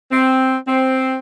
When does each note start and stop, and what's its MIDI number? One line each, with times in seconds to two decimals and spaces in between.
0.11 0.57 60
0.68 1.18 60